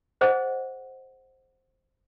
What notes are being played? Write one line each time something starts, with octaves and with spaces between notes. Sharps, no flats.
G#4 C5 D#5 F#5